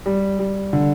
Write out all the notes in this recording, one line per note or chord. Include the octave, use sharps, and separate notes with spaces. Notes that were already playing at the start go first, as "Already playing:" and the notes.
G3
G3
D3